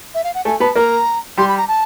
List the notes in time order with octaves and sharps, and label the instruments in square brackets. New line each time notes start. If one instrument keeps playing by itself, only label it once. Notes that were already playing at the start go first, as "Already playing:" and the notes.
[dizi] E5
F5
F#5
[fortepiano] A3 A4 [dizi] G#5
[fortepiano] B3 B4 [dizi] A5
[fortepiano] A#3 A#4 [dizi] A#5
[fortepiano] G3 G4 [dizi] C6
[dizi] B5
A#5
A5